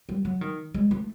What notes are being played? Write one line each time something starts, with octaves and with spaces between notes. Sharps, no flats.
G3
F#3
D#3
G#3
A3